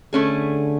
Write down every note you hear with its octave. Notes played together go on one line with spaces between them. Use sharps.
D3 A3 C#4 G#4